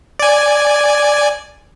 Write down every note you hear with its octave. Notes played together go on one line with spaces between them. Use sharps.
D5 G#5